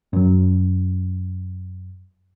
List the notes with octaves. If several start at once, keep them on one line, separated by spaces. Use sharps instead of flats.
F#2 F#3